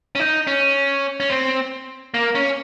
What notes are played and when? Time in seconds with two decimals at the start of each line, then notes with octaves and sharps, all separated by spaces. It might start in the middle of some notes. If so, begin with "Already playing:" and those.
0.15 C#4
0.19 D#4
0.47 C#4
1.20 C#4
1.30 C4
2.14 A#3
2.35 C#4